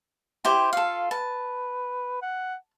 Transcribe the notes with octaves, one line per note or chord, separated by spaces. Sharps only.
E4 G4 C5 G5
F4 A4 F5
B4 A5
F#5